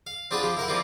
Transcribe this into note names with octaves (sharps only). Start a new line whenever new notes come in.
F5
C4 D4 F4 G#4 F#5 B5
F3 G4
E4 A#4 F#5
F3 G3 A#3 C4 E4 F4